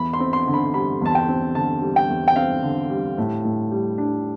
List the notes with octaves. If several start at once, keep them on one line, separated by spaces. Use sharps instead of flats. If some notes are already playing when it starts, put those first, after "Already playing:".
Already playing: E2 B5
C6
C4
C6
D3
B5
G3 B5
E2 A5
G5
C4
D3 A5
G3
G5
E2
G5
C4 F5
D3
G3
A2
A2
G3
D4